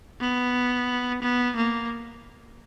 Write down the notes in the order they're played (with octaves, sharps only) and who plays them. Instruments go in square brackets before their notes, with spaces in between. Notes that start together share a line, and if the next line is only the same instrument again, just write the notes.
[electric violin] B3
B3
A#3